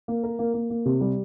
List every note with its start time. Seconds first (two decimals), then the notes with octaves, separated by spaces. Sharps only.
0.08 A#3
0.23 A#4
0.39 A#3
0.54 A#3
0.70 A#3
0.86 C3
1.01 G3